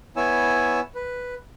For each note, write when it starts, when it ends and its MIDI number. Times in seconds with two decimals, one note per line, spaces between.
0.16 0.80 59
0.16 0.80 64
0.16 0.80 73
0.16 0.80 80
0.16 0.80 88
0.95 1.35 71